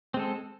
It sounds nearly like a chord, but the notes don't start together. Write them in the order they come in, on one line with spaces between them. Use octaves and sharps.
C4 G#3 A4